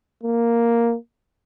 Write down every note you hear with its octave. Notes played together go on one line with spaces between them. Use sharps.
A#3